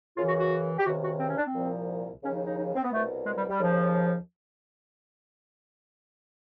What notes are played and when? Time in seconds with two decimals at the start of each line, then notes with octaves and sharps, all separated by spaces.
0.16 F#2 C#3 E3 F4
0.28 F#4
0.39 F#4
0.78 G4
0.85 C#2 C3 D#3 F#4
1.03 F#4
1.19 C4
1.28 C#4
1.37 D4
1.45 C4
1.54 C2 A#2 F3
2.23 D#2 C#3 F3 C#4
2.34 D#4
2.46 D#4
2.57 D#4
2.75 C4
2.83 B3
2.92 C2 B2 A3
3.26 G#3
3.37 G3
3.49 G3
3.60 D#2 C#3 F3